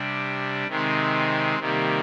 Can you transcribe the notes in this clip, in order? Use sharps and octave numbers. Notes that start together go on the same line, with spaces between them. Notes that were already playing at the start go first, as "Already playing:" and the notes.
Already playing: C3 G3 D4
C3 D#3 G#3 C4
C3 D#3 G3 A#3